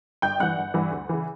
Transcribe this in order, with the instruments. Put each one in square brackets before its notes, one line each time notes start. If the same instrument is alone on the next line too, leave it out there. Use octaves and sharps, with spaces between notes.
[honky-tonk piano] G1 G5 G6
G2 E3 F#5 F#6
G1
G2 E3
D2
C#3 E3